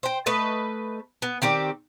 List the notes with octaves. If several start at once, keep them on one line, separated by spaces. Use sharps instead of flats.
C5 G5
A3 B4 D#5
B3
D#3 C4 G4 D5